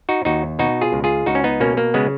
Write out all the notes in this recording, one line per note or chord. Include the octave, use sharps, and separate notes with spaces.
D#4 F#4
D#2 D#4 F#4
B2 D#4 F#4
F4 G#4
C#2
F4 G#4
C#2 D#4 F#4
C#4
B3 D#4
B2 A#3 C#4
A#3
C#3 G#3 B3